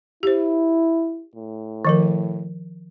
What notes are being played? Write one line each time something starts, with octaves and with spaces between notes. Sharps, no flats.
E4 G4 C5
A2
D#3 F3 A#4